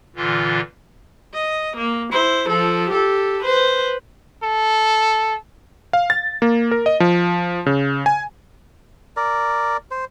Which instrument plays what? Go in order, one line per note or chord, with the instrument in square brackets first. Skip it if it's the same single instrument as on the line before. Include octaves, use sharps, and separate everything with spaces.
[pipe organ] A#2 D3 E3 F4
[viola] D#5
A#3
E4 C5
F3 A4
G4 A4
B4 C5
[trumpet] A4
[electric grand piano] F5
A6
A#3
A#4
D#5
F3
C#3
G#5
[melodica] A#4 D5
C5